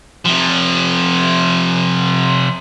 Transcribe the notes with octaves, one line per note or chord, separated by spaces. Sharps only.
C3 F3